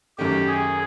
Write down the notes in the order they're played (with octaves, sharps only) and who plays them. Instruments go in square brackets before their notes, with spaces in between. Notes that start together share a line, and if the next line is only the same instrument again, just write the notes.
[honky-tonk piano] F#2 D#3 F#3 A3 C#4 [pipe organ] G4
[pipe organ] G#4